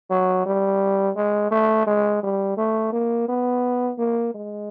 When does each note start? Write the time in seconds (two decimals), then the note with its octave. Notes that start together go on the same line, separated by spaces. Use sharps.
0.10 F#3
0.46 G3
1.16 G#3
1.51 A3
1.87 G#3
2.23 G3
2.57 A3
2.93 A#3
3.28 B3
3.99 A#3
4.34 G#3